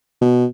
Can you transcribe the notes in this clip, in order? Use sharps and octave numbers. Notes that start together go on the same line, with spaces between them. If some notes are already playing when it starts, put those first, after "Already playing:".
B2